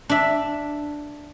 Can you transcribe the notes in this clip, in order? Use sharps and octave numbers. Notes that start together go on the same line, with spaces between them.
D4 E5